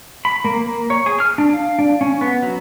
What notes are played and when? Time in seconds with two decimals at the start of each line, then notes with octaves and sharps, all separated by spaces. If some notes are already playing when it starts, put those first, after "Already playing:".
0.25 B5
0.45 A#3
0.66 A#3
0.90 C#5
1.06 G#4
1.20 F6
1.38 D4
1.53 F5
1.79 D4
2.01 C#4
2.21 B3
2.42 F#3